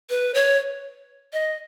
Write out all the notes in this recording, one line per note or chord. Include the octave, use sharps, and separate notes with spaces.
B4
C#5
D#5